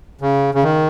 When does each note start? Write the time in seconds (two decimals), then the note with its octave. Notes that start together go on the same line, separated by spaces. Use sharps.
0.21 C#3
0.55 C#3
0.64 D#3